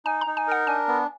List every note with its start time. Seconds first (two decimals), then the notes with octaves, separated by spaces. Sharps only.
0.05 D#4 G#5
0.21 A#5
0.27 D#4
0.37 G#5
0.48 A#4 F#5
0.67 D4 G#5
0.88 B3